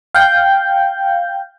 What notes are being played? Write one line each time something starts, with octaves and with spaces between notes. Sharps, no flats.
F5 G5 G6